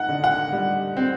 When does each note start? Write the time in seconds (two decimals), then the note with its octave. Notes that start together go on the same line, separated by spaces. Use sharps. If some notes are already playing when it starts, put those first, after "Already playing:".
Already playing: D#4 F#5
0.09 D3
0.24 F#5
0.52 G3
0.97 C4